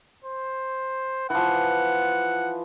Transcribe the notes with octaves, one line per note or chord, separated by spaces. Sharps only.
C5
E3 F3 F#5